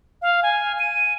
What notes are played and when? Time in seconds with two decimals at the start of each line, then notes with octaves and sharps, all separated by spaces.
0.22 F5
0.43 G#5
0.79 D#7